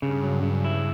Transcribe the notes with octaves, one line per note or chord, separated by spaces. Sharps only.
G2 C#3
F#3
C#3
E4